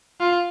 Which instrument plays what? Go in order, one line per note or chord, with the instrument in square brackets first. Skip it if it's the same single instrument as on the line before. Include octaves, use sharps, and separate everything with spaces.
[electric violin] F4